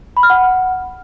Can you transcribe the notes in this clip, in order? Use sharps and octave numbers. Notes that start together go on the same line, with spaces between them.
B5
F6
F#5